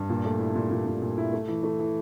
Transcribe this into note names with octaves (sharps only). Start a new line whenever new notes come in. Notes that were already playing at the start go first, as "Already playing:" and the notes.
Already playing: G2
A#2
A3
E4
A#2
A#2
A#2
A#2
E4
A3
E3
A3
E3